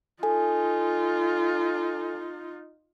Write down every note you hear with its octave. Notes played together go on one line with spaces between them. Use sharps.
D#4 F4 A4 G#5